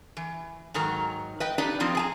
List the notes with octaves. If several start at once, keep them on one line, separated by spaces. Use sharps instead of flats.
E3
G#2 D#3 F#3 A#4 A#5
B4 D#5 G5
D4 D#4 G4 B4 D5
F3 C4 D4 F4
G#4 G#5 A#5